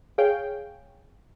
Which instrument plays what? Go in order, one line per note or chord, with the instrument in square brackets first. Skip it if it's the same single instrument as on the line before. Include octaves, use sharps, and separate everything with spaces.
[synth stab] G#4 C#5 F5 G5